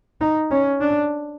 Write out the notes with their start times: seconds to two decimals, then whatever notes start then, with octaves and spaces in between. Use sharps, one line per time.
0.21 D#4
0.51 C#4
0.81 D4